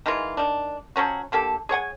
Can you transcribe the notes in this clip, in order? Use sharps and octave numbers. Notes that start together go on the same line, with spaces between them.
D#3 E3 G#3 F4
D#3 D4
F3 F#3 C#4 F#4
D3 A#3 G4 A4
G#4 C#5 F#5 G#5